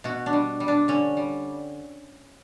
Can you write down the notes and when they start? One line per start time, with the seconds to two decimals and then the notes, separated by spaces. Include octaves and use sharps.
0.04 B2 F#4
0.26 D4
0.33 G3
0.60 G3
0.68 D4
0.88 D3 C#4
1.17 G3